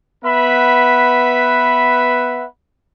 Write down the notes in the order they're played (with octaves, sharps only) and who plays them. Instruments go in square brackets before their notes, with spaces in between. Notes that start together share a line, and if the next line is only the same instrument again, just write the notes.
[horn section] B3 B4 E5 F#5 B5